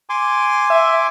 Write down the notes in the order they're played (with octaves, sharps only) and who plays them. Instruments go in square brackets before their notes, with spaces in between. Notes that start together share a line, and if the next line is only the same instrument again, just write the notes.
[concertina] G#5 C6 D6
[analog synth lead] E5